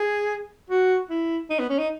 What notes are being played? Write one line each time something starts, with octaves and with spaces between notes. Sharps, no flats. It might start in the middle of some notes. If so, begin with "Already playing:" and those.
Already playing: G#4
F#4
E4
D#4
B3
C#4
D#4